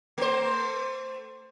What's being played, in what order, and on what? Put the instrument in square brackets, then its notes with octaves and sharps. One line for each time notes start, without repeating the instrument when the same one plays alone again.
[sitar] A3 C5